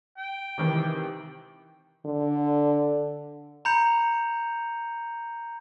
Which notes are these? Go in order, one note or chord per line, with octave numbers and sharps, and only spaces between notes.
G5
C3 D#3 E3
D3
A#5 B5 G6 C#7 F7